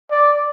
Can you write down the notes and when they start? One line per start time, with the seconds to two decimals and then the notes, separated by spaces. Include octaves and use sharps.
0.10 D5